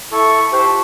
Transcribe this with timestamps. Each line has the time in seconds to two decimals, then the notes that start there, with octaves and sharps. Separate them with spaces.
0.12 E4 A4 C#6
0.52 G4 C5 A5 C#6 F#6
0.65 F4 A5